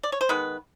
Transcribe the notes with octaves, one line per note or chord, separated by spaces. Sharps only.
D5
C#5
C5
D#3 G#3 B3 B4